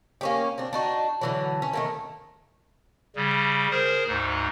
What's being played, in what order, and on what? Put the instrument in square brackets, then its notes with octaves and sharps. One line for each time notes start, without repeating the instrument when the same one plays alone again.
[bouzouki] A#3 C#4 G4
C4 D4
D4 D#4 F#4
D3 E3 F#3
C#4
D#3 A3 A#3
[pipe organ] C#3 G3
G#4 A#4 C5
D2 G#2 D#4